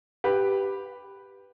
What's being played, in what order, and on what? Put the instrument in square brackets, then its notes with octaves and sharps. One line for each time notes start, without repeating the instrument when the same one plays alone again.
[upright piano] G4 B4